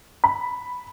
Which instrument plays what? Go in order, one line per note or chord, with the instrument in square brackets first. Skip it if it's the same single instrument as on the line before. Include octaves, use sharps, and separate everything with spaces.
[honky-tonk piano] B5